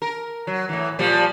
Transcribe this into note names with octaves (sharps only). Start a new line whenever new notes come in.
A#4
F#3
A2 E3
A#2 F3 G3